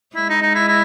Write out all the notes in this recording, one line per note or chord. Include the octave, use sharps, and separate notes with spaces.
G#3 E4
D#4
D#4
E4
E4